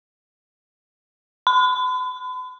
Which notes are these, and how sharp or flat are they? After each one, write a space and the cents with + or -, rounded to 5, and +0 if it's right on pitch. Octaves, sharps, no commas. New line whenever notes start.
B5 +40